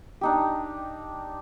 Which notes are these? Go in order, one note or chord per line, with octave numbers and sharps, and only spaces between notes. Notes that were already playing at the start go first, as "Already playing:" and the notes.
D4 D#4 G4